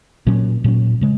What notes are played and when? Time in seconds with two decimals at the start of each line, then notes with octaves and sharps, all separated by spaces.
0.26 A#2 F#3 C#4
0.64 A#2 F#3 C#4
1.01 C#3 G#3